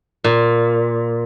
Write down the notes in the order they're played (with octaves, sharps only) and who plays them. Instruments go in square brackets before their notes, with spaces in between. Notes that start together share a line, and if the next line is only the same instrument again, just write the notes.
[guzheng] A#2